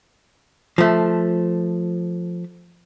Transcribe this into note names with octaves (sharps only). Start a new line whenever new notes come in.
F3 A3